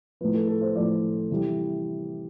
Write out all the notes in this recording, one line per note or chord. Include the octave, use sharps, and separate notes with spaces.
A2 F3 B4
A4
A4
C5
A2 F3 D5
C3 E3 G3